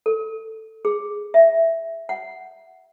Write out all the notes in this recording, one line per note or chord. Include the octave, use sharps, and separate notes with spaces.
A4
G#4
E5
F#5